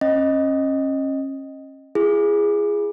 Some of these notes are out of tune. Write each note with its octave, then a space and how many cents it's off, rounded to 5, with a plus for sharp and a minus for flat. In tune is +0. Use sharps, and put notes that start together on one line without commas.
C#4 -35 D#5 +0
E4 +45 G#4 -10